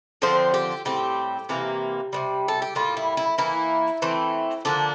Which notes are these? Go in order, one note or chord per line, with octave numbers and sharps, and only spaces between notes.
D3 F3 C4 C5
G4
A2 G3 C4 G4
C3 E3 A#3
C3 E3 G3
A4
G4
A2 G3 A#3 F4
E4
E4
E3 A#3 E4
E3 A3 C4
D3 F3 A#3 D4